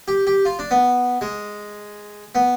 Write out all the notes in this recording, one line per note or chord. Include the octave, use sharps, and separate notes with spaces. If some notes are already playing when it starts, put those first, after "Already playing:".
G4
G4
F4
D4
B3
G#3
B3